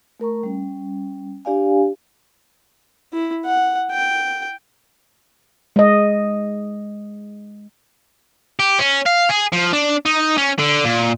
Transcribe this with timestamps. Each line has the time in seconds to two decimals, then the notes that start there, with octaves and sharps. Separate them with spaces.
0.20 A3 A#4 A#5 C#6
0.43 G3 C#4
1.45 D4 G4 D5 F5 G#5
3.13 E4
3.45 F#5
3.91 G5
5.76 G#3 D#5
8.60 G4
8.79 C#4
9.06 F5
9.30 G#4
9.53 F3
9.73 D4
10.05 D#4
10.38 C#4
10.59 D3
10.85 A#2